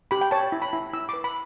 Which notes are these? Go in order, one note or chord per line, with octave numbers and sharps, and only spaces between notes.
G4 B5
G5
C#5 A5
E4
B5
E4
E4 E6
B4 D6
B5